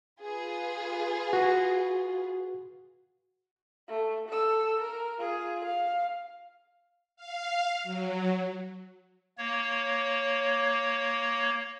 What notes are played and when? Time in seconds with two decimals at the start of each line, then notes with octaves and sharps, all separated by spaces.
0.21 F4 G#4 B4
1.33 F#4
3.89 A3
4.29 A4 E6
4.80 A#4
5.19 F4 G#4
5.65 F5
7.16 F5
7.83 F#3
9.38 A#3 C#5